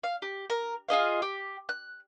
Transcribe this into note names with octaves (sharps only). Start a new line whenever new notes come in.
F5
G4
A#4
F4 G#4 D#5 F5
G4
F#6